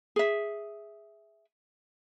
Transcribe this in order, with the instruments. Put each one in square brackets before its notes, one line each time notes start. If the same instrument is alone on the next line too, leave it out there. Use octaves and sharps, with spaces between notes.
[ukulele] G#4 E5